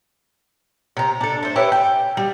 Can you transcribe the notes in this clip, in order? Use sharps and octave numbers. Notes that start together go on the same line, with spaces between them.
C3 A#5
D4 A4
A3 C5
E4 G4 B4 C#5
G5
G3